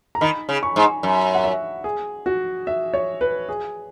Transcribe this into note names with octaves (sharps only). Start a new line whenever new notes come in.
A#5
D#3 B5
C#3
C#6
G#2
F#2
F#5
E5
G#4
F#4
E5
C#5
B4
G#4